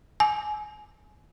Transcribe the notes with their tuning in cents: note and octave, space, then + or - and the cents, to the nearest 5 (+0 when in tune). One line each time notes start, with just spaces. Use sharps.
G#5 +25